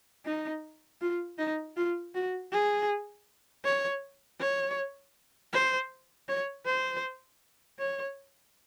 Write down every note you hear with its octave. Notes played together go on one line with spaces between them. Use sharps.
D#4
F4
D#4
F4
F#4
G#4
C#5
C#5
C5
C#5
C5
C#5